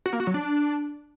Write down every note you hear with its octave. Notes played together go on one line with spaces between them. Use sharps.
F#4
A#3
F#4
F#3
D4